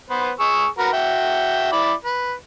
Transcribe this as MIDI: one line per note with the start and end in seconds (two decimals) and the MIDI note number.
0.10 0.31 59
0.10 0.31 71
0.10 0.31 72
0.40 0.66 68
0.40 0.66 85
0.40 0.66 88
0.79 0.93 66
0.79 0.93 70
0.79 0.93 71
0.93 1.72 66
0.93 1.72 76
0.93 1.72 79
1.72 1.92 64
1.72 1.92 74
1.72 1.92 83
2.05 2.34 71